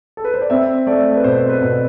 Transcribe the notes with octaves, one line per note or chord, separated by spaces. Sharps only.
A4
B4
C5
D5
C4 E5
A3 D5
B4
B2 C5
B4
B2